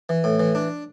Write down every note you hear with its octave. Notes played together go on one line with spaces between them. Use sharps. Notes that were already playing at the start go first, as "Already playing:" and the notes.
E3
A2
E3
D4